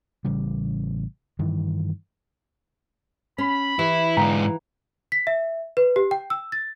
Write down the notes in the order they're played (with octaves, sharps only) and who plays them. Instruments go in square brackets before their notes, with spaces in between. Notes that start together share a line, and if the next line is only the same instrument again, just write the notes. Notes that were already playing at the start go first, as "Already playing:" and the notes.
[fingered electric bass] A1 C#3 G3
G2 D#3 E3
[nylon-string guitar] C#4 [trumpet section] B5
[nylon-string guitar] E3 [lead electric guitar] E4 [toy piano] G4
[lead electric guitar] G#2 D3 [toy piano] F5 G5 A#5
[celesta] B6
E5
B4
G4
G5
E6
A6